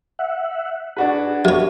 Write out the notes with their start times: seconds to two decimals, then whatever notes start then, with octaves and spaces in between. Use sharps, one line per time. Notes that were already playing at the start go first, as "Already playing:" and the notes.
0.19 E5 F#5
0.97 D4 F#4 G#4 B4
1.45 F#2 G4 C#5